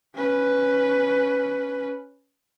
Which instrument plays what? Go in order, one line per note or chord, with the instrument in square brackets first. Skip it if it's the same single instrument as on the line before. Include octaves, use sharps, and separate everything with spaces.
[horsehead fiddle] C#4 B4